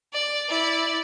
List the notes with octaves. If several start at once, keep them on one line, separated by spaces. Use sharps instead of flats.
D5
E4 D5